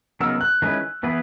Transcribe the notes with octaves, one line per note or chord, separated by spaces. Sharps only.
C#3 F#3 B3 D#4 A#4 E6
F#6
D#3 G#3 C#4 E4 B4
E3 B3 E4 G#4 B4